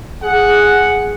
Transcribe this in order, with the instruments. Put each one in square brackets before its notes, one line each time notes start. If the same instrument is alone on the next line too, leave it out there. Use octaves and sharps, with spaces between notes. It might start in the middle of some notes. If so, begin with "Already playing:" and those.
[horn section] G#4 F#5